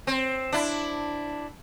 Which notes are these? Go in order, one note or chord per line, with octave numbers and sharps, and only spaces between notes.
C4
D4 E4